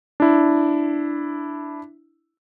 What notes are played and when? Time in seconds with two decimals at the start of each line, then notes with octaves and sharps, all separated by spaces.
0.20 D4 E4